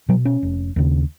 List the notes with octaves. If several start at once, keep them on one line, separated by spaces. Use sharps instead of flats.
B2 F#3
C#4
F1
D#2 C#3